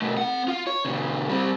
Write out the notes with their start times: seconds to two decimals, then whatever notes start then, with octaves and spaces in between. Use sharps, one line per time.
0.02 B2 A3
0.17 C4 F#5
0.48 F4
0.67 C#5
0.85 A#2 C#3
1.29 G3 C4